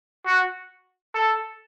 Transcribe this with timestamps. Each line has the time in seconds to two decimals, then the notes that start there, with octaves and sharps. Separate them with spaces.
0.26 F#4
1.15 A4